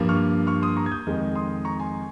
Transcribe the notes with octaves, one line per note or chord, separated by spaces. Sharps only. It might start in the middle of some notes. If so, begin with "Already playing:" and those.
Already playing: G2 F3 A#3
C#6 F6
C#6 F6
C6 D#6
A#5 C#6
G#6
D#6 G6
F2 D#3 G#3
C6 D#6
A#5 C#6
G#5 C6